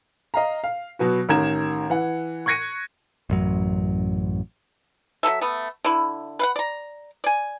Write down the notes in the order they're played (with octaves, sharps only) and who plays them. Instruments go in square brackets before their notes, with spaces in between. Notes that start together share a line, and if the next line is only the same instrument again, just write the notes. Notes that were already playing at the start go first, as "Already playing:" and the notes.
[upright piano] D#5 F5 A#5
F5
B2 F#3 B3 F#4
A1 D#3 A#5 G#6 E7
E3 F#5
C#6 F#6 G#6 A#6 C#7 D#7
[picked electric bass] A1 F#2 F#3
[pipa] F#3 A#3 A4 E5
A3 B3
D3 E4
B4 F5 F#5
D5 A#5
D5 G#5